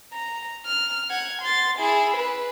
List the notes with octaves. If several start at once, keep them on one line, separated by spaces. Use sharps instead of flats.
A#5
F6
F#5 G#6
C6 A6
E4 G#4
B4